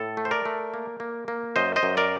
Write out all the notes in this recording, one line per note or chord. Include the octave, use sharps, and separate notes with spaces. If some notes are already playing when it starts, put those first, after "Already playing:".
Already playing: A2 A4
A3
C5
A#4 D5
A3
A#3
A#3
A#3
F#2 C5 D#5
C5 D#5
F#2
A#4 D5